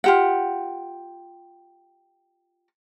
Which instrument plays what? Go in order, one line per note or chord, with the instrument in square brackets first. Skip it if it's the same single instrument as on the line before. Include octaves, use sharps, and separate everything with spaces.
[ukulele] F4 G4 F#5